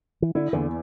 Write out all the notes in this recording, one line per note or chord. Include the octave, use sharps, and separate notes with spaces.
E3
D3 E4
E2 D3